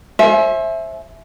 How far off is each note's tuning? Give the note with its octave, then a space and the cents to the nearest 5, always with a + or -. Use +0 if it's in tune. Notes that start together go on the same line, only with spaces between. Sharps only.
C5 +35 E5 +0 G#5 +35